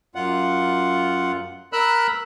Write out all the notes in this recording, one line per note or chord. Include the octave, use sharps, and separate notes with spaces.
F#2 F4 F#5
A#4 B5 E6 F#6